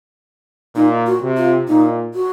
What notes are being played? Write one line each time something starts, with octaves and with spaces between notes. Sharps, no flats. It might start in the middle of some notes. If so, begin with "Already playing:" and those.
A#2 D#4
F#4
C3
F4
A#2 D#4
F#4